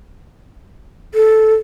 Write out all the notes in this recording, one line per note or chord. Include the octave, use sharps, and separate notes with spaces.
A4